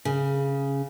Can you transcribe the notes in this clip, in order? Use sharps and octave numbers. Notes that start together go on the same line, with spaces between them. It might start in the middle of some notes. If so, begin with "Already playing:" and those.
C#3